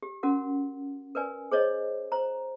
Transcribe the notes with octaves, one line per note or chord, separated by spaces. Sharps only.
G4
C#4 F#4 A#4 F#5
A#4 B4 D5 G#5
G#4 C5 C#5 D#5
C5 A#5